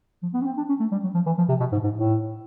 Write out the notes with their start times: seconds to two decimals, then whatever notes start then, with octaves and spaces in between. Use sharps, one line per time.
0.23 F3
0.34 B3
0.41 C#4
0.46 C4
0.57 D4
0.69 C#4
0.80 A3
0.92 G3
1.04 F#3
1.14 F3
1.26 E3
1.38 F3
1.49 C3
1.60 B2
1.72 G#2
1.84 G#2
1.95 A2